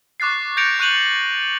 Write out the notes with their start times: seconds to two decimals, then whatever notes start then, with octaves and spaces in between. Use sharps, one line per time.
0.20 C#6 D6 F#6 A6 C7
0.57 G6 A6 A#6 C#7 D7 F7
0.79 C#6 F#6 G6 D#7 F7 F#7